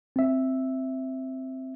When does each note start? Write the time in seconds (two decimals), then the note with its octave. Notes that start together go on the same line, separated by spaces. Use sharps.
0.16 C4 E5